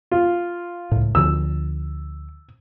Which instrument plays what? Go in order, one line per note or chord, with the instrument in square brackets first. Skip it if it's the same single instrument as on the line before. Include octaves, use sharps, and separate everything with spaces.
[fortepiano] F4
[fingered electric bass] C#2 A2
[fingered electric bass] D2 D3 F3 [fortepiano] E6